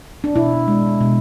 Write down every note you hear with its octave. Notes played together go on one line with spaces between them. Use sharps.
D4
B2 E4
G#3
B2